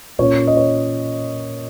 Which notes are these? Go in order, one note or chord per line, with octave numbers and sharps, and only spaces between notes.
A#2 A#3 C#4 C#5
D#5
C#5